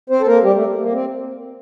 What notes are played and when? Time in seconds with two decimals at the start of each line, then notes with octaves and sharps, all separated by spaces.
0.10 C4 C5
0.21 A4
0.27 A#3 A#4
0.43 G3 G4
0.56 A3
0.81 A#3
0.93 C4